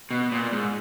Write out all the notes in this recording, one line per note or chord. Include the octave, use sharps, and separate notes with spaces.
B2
A#2
G#2